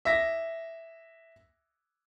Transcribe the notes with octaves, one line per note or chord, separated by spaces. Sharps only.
E5 A#6